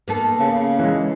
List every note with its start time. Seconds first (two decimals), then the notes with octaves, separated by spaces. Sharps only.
0.08 A#3 B3 A4
0.40 C#3
0.79 E3 G#3